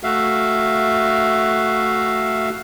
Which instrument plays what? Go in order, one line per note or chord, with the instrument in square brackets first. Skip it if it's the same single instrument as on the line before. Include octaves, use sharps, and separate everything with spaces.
[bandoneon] A3 F#4 E5 F5